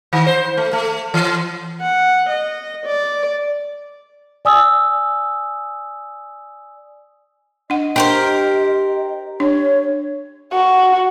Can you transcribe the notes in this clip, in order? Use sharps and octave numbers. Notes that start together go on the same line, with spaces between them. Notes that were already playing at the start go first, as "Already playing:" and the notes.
D#3
C5
A3
A3
E3
F#5
D#5
D5
D5 G#5 D#6 E6
D4 D#5 F#5
D4 G4 A#4 C5
D4 C#5
F#4